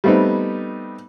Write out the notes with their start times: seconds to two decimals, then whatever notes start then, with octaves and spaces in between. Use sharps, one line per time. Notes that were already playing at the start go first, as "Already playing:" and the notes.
0.04 G3 A3 B3 C4 D#4